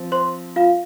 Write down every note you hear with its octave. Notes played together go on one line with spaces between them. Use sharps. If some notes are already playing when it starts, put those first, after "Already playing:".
Already playing: F3 C4
C5 C6
F4 F5